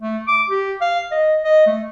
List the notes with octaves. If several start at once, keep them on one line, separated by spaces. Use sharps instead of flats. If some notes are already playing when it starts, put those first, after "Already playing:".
A3
D6
G4
F5
D#5
D#5
A3